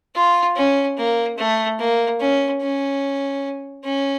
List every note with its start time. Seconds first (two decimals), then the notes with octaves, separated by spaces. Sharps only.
0.15 F4
0.56 C#4
0.97 A#3
1.38 A3
1.79 A#3
2.20 C#4
2.62 C#4
3.84 C#4